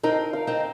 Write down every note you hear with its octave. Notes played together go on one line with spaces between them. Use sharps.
C4 D#4 A#4
F5
C4 D#4